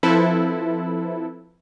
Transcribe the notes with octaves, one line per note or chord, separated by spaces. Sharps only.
F3 C4 E4 A4 B4